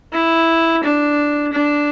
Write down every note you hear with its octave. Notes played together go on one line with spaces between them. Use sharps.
E4
D4
D4